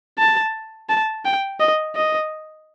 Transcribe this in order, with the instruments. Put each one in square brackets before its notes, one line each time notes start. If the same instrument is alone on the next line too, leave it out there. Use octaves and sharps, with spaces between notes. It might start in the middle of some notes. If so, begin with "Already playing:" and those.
[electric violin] A5
A5
G5
D#5
D#5